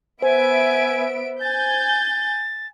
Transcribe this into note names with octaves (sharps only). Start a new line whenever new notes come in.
B3 C5 E5 G#5 D7
G#5 G6 A6